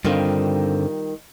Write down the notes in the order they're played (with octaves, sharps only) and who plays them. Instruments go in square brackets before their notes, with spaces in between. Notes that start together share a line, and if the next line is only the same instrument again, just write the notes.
[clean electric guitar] G2 D3 C4 [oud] D#3 G3 F4